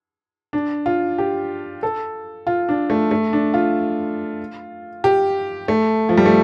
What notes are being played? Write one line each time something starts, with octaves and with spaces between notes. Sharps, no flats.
D4
F4
G4
A4
F4
D4
A3
A3
D4
F4
G4
A3
F3
G3
A3